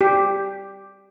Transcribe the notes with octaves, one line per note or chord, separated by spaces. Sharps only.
G4